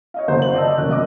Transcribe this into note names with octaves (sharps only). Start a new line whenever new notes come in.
C#5 D#5 F5
F#1 F#2 C5 F#5
F#7
D5 D#5 A5 E6
F1 C#4 A#4 F#6
F#2 D#5 D6